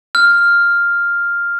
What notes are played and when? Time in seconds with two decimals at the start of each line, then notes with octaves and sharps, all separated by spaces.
0.15 F6